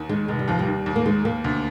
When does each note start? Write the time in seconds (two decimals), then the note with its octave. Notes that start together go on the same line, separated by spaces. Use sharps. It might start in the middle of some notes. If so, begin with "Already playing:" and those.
Already playing: D#2
0.09 D#3 G#3
0.28 F1 G#3
0.39 G3
0.48 D#2 F3
0.59 G3
0.67 D#2
0.86 D#2
0.96 A#3
1.06 D#3 G#3
1.25 D#2 A#3
1.44 D2